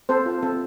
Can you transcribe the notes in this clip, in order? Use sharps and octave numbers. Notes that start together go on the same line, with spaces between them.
C4 A4 C5
F4
C4 A4